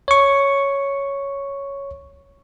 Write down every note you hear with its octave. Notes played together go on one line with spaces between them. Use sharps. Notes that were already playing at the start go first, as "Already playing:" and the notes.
C#5 C#6